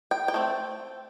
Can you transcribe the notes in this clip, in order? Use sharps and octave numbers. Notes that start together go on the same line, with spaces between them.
G5
G5
A3 C4